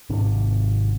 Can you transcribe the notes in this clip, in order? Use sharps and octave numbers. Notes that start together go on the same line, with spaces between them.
G#1 C3 D4